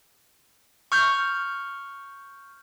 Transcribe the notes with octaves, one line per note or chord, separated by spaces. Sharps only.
C#6 F6 G6